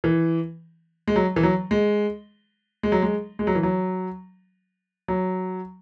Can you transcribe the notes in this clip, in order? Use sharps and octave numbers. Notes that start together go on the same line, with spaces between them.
E3
G#3
F#3
E3
F#3
G#3
G#3
F#3
G#3
G#3
F#3
E3
F#3
F#3